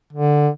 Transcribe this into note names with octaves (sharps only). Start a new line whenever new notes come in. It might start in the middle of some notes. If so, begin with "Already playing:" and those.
D3